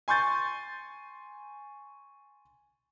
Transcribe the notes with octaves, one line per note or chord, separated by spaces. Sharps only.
G#5 C6 C#6 G6 A6